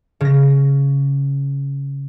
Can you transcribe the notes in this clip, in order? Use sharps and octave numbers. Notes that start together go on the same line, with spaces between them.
C#3 A#6